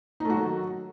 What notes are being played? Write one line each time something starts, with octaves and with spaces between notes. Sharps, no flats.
D#3 F#3 A3 D#4 F#4